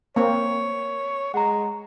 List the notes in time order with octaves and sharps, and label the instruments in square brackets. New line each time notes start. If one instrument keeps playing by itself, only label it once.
[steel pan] A#3 C4 [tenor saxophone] C#5
[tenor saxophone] G#3 [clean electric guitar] F#5 A#5